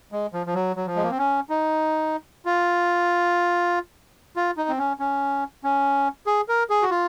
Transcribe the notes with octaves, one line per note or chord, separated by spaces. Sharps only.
G#3
F3
F3
F#3
F#3
F3
G#3
A#3
C4
C#4
D#4
F4
F4
D#4
C4
C#4
C#4
C#4
G#4
A#4
G#4
F#4
F4